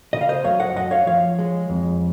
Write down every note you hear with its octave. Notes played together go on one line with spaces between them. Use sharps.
C#3 D#5
F5
C5 D#5
F#2 C#5 F5
D#5 F#5
F#2 D#5 F#5
C#5 F5
F3 C#5 F5
G#3
F2